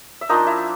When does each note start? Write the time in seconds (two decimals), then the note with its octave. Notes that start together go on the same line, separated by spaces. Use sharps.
0.21 E5
0.29 F3 A#3 D4 D#4 D#5
0.46 E4 E5